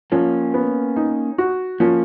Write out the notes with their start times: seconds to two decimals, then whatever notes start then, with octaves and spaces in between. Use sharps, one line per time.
0.12 F3 A#3 C#4
0.54 B3
0.96 D#4
1.38 F#4
1.80 F3 A#3 C#4